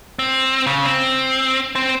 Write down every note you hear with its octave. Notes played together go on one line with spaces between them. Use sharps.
C4
C#3
C4
C4